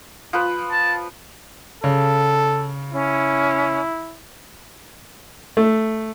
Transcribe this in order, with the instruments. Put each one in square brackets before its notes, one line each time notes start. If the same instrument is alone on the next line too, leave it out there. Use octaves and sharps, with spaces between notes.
[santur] F3 B4
[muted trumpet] A5
[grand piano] C#3 [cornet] A4
[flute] C#4 [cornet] E4
[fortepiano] A3